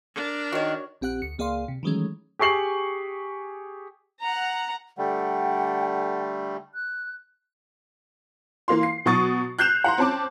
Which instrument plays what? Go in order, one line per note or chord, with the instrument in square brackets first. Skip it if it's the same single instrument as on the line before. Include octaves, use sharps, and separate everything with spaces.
[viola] D4 A#4
[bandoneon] D#3 [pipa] F#4 C#5
[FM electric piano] A#1 C4 G4 F#5 F#6
D2 C#7
C#2 A#3 G#4 D5 F5 C6
C3
D#3 E3 F#3 G#3 A3 C#4
[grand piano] G4 G#4 C#6 C7 F#7
[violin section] F#5 A#5
[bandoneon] D3 G3 A3 [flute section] F#5 G5
[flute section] F#6
[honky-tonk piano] E3 A#3 F5 C6
C7
B2 F#3 F#4 C#6 D#6 A6
F#6 G6 C7 E7 F7
F#5 A#5 C6
C4 C#4 A5 D6